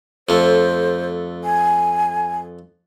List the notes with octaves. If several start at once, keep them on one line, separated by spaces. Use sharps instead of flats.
F2 A3 C5
G#5